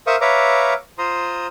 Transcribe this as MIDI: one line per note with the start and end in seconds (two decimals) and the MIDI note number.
0.07 0.16 70
0.07 0.16 72
0.07 0.16 76
0.07 0.16 77
0.07 0.16 85
0.07 0.16 87
0.21 0.74 71
0.21 0.74 73
0.21 0.74 76
0.21 0.74 77
0.21 0.74 82
0.21 0.74 86
0.98 1.47 65
0.98 1.47 72
0.98 1.47 82
0.98 1.47 84
0.98 1.47 87